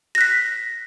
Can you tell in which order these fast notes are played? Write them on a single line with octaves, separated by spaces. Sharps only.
A#6 F#6 B6